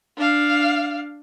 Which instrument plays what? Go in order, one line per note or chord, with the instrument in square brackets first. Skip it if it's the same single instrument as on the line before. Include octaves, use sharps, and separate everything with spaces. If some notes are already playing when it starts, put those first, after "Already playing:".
[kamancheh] D4 F5